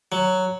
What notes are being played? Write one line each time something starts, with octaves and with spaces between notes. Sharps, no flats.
F#3